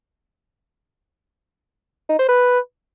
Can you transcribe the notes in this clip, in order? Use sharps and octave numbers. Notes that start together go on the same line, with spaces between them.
D#4
C5
B4